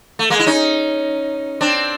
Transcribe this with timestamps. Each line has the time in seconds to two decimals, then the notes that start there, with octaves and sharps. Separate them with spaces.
0.19 A3
0.30 G#3 A#3
0.40 E4
0.46 C#4 D#4
1.61 C4 D4